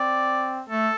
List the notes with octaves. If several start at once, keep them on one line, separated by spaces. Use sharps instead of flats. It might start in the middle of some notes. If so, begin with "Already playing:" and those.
Already playing: C4 D5
A3 A4